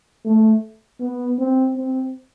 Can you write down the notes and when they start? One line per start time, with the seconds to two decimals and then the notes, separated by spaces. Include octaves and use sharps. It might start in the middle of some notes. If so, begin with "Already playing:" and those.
0.25 A3
1.00 B3
1.39 C4
1.76 C4